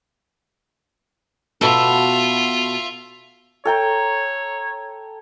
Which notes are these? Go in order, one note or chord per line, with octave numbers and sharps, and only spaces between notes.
B2 F4 A4 E5
A4 C#5 G5 A#5